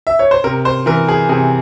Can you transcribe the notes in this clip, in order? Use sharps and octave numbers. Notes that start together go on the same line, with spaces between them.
E5
C#5
C5
C3 A#4
C5
E3 A#4
G#4
C3 G#4